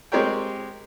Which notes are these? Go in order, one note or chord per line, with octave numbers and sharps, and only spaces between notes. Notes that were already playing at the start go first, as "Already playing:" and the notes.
G#3 C4 G4 A#4 C#5 G5